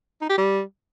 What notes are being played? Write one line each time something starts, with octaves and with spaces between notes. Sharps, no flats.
D#4
G4
G3